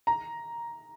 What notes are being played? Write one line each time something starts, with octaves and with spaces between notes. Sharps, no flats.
A#5